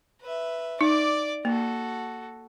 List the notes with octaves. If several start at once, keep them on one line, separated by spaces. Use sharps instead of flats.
B4 E5
D#4 D5 D6
A#3 F#4 A4